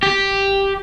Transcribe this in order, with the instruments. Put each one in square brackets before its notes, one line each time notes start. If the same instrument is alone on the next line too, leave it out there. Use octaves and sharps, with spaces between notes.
[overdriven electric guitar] G4